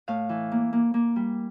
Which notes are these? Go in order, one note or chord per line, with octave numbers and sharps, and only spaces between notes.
A2 F5
E3
A#3
A#3
A#3
G3